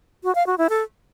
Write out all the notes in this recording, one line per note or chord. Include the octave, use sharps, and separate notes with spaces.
F#4
F5
F#4
E4
A4